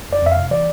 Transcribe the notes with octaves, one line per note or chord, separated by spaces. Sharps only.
F2 D5
F2 E5
C3 F5
E3 D5